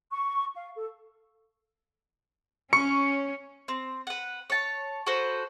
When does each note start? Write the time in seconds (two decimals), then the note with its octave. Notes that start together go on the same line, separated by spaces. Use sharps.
0.11 C#6
0.55 F5
0.75 A4
2.73 C#4 C#6 C#7
3.68 C4
4.07 B4 F#5
4.50 C#5 A5
5.06 F#4 A4 B4 C5